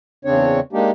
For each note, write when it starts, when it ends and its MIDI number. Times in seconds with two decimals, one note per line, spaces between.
0.25 0.60 40
0.25 0.60 49
0.25 0.60 60
0.25 0.60 62
0.25 0.60 73
0.73 0.91 56
0.73 0.91 58
0.73 0.91 62
0.73 0.91 63
0.73 0.91 67